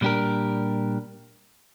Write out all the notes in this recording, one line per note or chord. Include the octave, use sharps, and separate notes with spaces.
A#2 G3 D4 G4 A#4